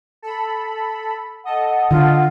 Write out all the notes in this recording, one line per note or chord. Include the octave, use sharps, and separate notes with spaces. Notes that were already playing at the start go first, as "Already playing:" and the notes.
A4 B5
A4 D#5 F#5
D3 F4